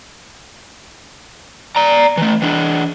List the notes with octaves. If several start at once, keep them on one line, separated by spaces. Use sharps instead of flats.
D5 A#5
E3 A3
E3 D4